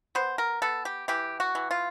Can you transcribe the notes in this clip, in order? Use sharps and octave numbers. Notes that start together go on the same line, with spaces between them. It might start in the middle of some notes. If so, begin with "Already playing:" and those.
B3 C5
A#4
B3 A4
G4
E3 G4
F#4
E3
F4